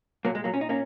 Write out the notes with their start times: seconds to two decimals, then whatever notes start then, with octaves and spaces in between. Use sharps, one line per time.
0.25 A#2 F#3 A#3
0.35 G#3
0.44 F#3 A#3
0.54 C#4
0.61 D#4
0.69 A#3 C#4